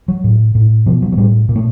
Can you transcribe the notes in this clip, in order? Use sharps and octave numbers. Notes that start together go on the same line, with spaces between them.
F#3
A2
A2
B2 F3
F#3
F#3
A2 G3
A#2
A3